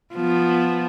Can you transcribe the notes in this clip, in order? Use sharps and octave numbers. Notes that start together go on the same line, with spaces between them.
F3 B3